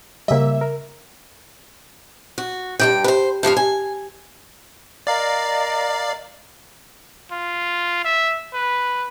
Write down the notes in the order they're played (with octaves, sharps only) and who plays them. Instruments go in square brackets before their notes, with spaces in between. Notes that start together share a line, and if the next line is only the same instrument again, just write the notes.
[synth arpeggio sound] C#3 D#5 [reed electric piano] G3 A#3 [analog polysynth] E5
[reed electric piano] A#4
[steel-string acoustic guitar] F#4
G2 E3 G5
B4 C5
G2 F3 G4 F5
G#5
[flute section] A#4 D#5 A#5 [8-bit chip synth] D5 F5
[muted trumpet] F4
E5
B4